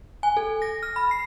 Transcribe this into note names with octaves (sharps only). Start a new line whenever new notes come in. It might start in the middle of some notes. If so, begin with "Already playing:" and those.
G#5
A4
A#6
F6
B5
C7